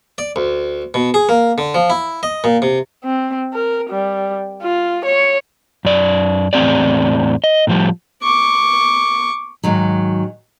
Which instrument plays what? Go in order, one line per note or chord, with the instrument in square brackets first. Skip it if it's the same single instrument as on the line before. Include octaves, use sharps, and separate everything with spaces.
[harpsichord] D5
D2
B2
G#4
A#3
D3
F3
E4
D#5
A#2
C3
[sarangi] C4
A#4
G3
F4
C#5
[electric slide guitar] F#2 D5
E2 A2 C4 G4 D5
D#5
A2 F3 G3
[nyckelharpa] C#6 D6
[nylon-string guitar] G#2 D#3 F#3